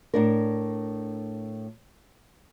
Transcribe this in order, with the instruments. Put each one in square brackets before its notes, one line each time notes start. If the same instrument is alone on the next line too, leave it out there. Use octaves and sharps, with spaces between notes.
[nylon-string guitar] A2 D4 A#4